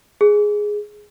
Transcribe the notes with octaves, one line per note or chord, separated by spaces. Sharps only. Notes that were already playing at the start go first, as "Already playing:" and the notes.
G#4